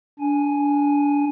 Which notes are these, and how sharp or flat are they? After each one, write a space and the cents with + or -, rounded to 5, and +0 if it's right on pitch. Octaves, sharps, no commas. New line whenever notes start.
D4 -25 G#5 +0